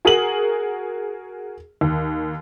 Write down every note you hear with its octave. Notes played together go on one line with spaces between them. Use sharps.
F#4 G#4 A#4 D#7 F#7
D#2